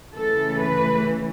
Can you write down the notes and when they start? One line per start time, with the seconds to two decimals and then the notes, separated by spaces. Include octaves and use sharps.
0.15 C#3 E3 A3 A4
0.60 B4